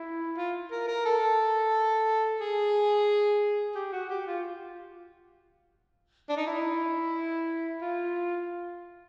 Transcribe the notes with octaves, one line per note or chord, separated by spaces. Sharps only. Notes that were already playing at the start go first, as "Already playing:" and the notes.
Already playing: E4
F4
A#4
A#4
A4
G#4
G4
F#4
G4
F4
D4
D#4
E4
F4